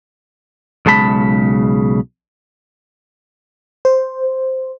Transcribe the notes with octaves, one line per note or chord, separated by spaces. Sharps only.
B1 C#3 G#3 A5 B5
C5